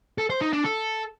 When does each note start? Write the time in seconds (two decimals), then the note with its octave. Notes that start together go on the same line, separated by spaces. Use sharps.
0.18 A4
0.30 C5
0.41 D#4
0.53 D4
0.64 A4